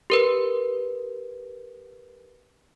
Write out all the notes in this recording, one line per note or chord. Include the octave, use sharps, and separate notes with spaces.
G4 A#4 B4